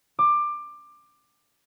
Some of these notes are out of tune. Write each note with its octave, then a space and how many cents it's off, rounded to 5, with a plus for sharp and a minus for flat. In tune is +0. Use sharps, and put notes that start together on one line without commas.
D6 +20